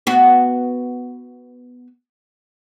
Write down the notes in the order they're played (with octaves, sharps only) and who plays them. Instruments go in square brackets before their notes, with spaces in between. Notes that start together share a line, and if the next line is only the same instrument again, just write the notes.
[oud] B3 F#4